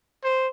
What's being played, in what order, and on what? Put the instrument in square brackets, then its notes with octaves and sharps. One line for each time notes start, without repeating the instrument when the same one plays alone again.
[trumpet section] C5